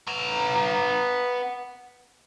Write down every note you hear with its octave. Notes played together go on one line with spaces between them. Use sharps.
B3 A#5